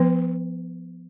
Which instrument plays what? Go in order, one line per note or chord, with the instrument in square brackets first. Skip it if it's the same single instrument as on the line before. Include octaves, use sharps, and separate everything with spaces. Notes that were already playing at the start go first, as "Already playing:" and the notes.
Already playing: [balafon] F3 B3 B4